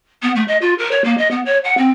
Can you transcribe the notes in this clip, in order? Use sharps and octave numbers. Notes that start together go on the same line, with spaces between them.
B3
A3
D#5
F4
A#4
C#5
A#3
D#5
B3
C#5
F#5
C4